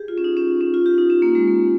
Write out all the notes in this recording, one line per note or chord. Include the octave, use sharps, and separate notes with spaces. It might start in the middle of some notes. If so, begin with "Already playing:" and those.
Already playing: G4 G#4
F4
C#4
D#4
C#4
C#4
F4
G4
D#4
C#4
A#3
G#3
A#3